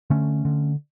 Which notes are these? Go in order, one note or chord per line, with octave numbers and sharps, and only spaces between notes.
D3 A3 C#4
D3